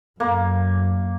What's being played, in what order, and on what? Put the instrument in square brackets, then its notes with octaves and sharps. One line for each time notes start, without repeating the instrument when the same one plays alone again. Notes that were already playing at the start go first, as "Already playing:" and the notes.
[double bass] F#2 [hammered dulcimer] A#3